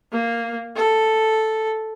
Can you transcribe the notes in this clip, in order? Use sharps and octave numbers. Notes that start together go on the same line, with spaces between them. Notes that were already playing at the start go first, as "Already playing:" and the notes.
A#3
A4